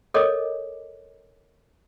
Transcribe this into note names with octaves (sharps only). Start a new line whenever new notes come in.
A4 A#4 C#5 D#5 D6